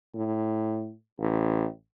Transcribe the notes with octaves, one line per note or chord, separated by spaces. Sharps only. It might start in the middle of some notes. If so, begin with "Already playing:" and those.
A2
A1